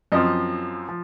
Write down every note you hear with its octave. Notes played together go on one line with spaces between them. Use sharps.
F#2 F3 C4 D#5
F3